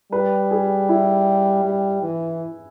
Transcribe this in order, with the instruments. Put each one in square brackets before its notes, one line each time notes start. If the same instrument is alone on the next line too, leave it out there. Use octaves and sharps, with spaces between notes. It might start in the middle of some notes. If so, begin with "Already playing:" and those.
[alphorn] G3 [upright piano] B4
[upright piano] G#4
E4
[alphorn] G3
E3